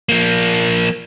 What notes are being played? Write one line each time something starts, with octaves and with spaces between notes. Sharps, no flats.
F3 A#3